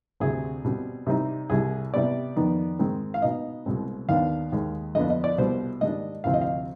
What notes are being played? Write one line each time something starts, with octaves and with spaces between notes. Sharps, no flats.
D2 C3 G3 C4 G#4
B2 G3 C4
C3 G3 C4 D#4
C2 C3 G3 G#4
C3 G3 B3 D5
F2 D#3 B3 D#4
G#2 D#3 G#3 C4 D#4
F5
B2 B3 D#4 D#5
C2 B2 G#3 C4
D#2 D#3 B3 D4 F5
D#2 D#3 G#3
F2 D3 F3 B3 D4 D#5
D#5
D5
C2 B2 G3 B3 C5
G#2 D#3 G3 D4 D#5
D2 C3 F3 C4 F5
D#5
F5